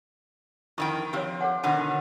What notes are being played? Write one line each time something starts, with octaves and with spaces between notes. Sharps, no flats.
F2 D#3 E4 G5 C#6
F3 C4 G4 C#5
A4 C#5 F#5
B2 D3 D#3 F#5